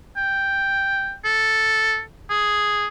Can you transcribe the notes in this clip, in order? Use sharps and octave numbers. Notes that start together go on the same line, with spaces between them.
G5
A4
G#4